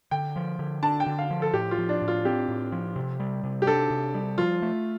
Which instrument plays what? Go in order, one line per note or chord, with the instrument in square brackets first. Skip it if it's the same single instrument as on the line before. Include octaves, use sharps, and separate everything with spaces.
[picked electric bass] D3 [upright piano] G5
[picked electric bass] F3
D3
[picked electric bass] D4 [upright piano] A5
[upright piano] G5
[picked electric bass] D3
[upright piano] F5
[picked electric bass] F3
[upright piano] A4
[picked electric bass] A2 [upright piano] G4
[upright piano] F4
[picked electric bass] F3
[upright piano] D4
[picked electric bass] A2
[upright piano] F4
[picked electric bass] C4 [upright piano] G4
[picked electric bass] A2
F3
C3
G3
C3
[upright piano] G4
[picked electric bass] D4 [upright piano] A4
[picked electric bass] C3
G3
[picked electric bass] F3 [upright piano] F4
[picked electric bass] A3